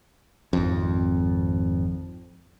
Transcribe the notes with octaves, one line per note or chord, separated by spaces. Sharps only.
G#1 F2